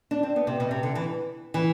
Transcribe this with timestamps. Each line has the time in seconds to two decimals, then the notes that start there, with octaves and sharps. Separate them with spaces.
0.11 D4
0.23 C4
0.36 B3
0.47 C3
0.60 B2
0.71 C3
0.83 D3
0.95 E3
1.54 E3